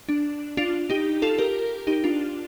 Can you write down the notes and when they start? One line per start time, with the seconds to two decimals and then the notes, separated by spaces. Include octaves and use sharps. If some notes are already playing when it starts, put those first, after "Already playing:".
0.09 D4
0.57 D4 F4
0.90 D#4 G4
1.22 F4 A4
1.39 G4 A#4
1.87 D#4 G4
2.04 D4 F4